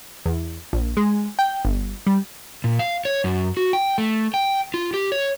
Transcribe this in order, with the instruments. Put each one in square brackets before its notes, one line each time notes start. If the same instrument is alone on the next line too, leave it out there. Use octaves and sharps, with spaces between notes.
[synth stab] E2
A#1
G#3
G5
G1
G3
[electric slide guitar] A#2
F5
C#5
F#2
F#4
G5
A3
G5
F4
G4
C#5